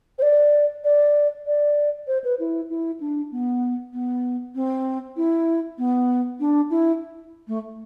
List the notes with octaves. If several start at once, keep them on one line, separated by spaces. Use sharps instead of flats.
C5
D5
D5
D5
C5
B4
E4
E4
D4
B3
B3
C4
E4
B3
D4
E4
A3